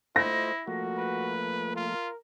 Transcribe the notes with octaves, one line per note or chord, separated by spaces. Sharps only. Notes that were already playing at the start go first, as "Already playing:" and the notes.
A3 E4 F4 C5 D#5 A#6
F3 A3 A#3 F#4
B4
F4 A#4